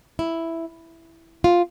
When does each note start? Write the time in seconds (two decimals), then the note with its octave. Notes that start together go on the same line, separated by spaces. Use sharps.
0.19 E4
1.44 F4